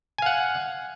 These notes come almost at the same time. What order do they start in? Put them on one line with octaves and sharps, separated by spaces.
G#5 F5 F#5